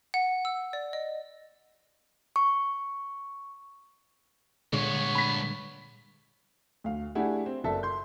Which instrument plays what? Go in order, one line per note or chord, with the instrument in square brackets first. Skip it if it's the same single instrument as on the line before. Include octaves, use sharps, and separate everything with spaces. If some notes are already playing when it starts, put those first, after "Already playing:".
[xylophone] F#5
E6
D5
D#5
[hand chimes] C#6
[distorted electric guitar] G2 B3 [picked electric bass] A#2 D3 G#3 [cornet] C#5
[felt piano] B5 B6
[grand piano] D2 F5
A3 D4 E4 G4 G#4 F#5
C4
F#1 A4 D5 E5 A5
C6 G6